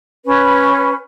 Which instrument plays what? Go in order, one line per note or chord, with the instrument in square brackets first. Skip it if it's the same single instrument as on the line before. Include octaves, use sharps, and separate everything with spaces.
[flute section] C#4 B4